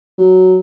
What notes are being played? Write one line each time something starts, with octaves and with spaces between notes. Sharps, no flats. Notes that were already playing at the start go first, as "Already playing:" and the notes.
F#3